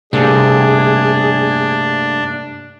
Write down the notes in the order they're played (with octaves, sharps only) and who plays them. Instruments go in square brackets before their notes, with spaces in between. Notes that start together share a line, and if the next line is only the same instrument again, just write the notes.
[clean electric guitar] G2 A3 A#3 [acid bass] C3 [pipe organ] D4 [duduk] G#4